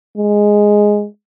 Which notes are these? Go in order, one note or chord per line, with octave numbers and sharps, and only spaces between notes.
G#3